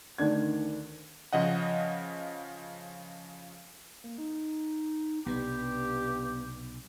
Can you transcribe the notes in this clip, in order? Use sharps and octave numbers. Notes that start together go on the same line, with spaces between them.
D2 D#3 D4 G#6
C#3 F3 D#5 F#5
A#3
D#4
B1 G2 C3 B3 G4